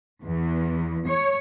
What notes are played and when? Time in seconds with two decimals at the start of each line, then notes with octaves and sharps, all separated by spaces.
0.23 E2
1.07 C#5